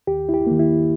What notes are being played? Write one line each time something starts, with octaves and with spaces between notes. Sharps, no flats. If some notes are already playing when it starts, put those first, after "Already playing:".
D#2 G4
E4
G4
D#3 A#3
E4